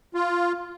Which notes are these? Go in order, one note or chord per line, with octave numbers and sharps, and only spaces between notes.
F4